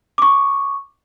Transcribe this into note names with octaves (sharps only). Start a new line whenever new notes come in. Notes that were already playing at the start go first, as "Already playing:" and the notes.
C#6 D6